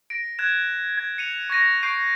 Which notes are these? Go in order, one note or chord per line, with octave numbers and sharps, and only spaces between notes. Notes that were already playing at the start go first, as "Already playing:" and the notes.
A#6 D7
F#6 G#6 E7
G#6
C#7 D#7 F7
C#6 G#6 A#6 D#7
C#6 G6 C7 D7 D#7